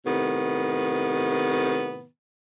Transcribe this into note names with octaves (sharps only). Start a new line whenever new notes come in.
A2 C3 D#3 B3